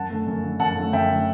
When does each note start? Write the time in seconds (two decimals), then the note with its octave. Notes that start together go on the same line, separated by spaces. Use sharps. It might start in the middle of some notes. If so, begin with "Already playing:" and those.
Already playing: F#2 F#5 A5
0.10 D3 A3
0.27 F#2
0.43 D3 A3
0.60 F#2 F#5 A5
0.76 D3 A3
0.93 F#2 E5 G5
1.10 D3 A3